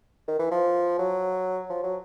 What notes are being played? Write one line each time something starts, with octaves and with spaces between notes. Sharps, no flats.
D#3
E3
F3
F#3
F3
F#3